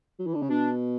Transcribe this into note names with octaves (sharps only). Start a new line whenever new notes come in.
F#3
E3
D3
C#3
B2 D4